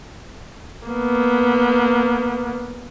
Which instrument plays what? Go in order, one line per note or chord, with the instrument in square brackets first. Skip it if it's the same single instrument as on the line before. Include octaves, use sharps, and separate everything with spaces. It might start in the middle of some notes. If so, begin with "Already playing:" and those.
[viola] A#3 B3